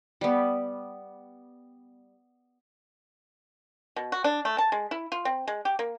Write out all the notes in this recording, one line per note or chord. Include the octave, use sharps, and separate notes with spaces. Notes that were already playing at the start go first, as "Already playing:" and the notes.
G3 B3
B2
F#4
D4
A3
A5
G#3
E4
F4
C4
G#3
G4
A#3